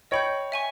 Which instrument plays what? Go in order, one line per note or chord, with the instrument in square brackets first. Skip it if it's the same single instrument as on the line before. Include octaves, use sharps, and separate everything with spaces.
[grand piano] C#5 [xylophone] D#5 G5 B5 G6
[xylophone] E5 G#5 C#6